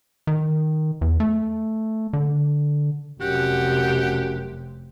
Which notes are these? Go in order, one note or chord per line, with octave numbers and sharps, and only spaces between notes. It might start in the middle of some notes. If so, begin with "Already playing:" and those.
D#3
E2
A3
D3
F1 F#2 C3 G4 F#5